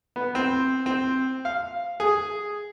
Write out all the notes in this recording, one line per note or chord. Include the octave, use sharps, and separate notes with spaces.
B3
C4
C4
F5
G#4